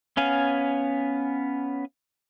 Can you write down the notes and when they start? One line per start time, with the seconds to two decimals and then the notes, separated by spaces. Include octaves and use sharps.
0.17 B3 C#4 F5 G#5